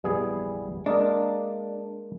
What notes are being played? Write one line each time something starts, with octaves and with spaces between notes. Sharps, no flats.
F1 A#1 E3 G3 B3 G#4
G#3 A#3 D4 A#4 D#5